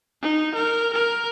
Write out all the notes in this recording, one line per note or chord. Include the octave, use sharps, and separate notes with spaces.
D#4
A#4
A#4